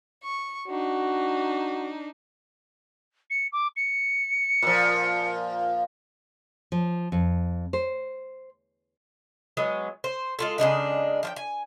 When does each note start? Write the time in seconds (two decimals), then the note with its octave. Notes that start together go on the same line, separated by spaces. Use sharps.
0.24 C#6
0.68 D4 D#4 F#4
3.30 C#7
3.52 D6
3.76 C#7
4.62 A#2 F3
6.72 F3
7.12 F2
7.73 C5
9.57 F#3 G#3 B3
10.04 C5
10.39 G#3 F4 A4
10.58 C#3 G#3 D4 D#4
11.23 F3 F5 G5
11.36 G#5